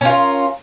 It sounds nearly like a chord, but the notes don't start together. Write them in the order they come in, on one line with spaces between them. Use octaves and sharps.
C#4 F4 A#4